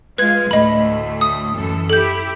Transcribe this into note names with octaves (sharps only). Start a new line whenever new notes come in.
G#3 F4 B4 G#6
D2 A2 A3 D#5 B5
D#6
F#2 E3 A4
E4 G4 A4 G6